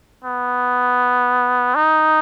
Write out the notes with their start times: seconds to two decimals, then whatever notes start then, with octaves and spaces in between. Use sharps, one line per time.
0.25 B3
1.75 D#4